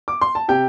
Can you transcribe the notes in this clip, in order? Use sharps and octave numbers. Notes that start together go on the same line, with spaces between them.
D6
C6
A5
C3 G4 G5